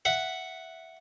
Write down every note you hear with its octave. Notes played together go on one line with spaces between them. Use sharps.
E5 F#5